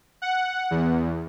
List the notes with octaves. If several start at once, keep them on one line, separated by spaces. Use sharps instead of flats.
F#5
E2